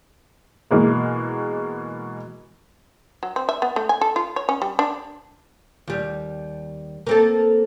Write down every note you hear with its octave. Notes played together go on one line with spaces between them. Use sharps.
B2 E3 G#3 A#3
F#3
C4
E5
B3
A3
G#5
A4
F4
C#5
C#4
G3
D4
D#2 G3
A#3 C4 A4